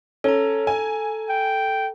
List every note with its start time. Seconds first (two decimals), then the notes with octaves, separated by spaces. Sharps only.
0.24 C#4 A4 A#5
0.67 G#5
1.29 G5